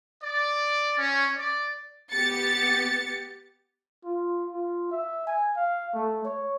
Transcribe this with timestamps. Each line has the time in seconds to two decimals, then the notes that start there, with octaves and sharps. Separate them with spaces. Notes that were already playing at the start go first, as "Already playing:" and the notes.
0.23 D5
0.98 C#4
1.38 D5
2.11 B3 G4 A6 C#7
4.05 F4
4.52 F4
4.91 E5
5.27 G#5
5.56 F5
5.94 A3
6.24 C#5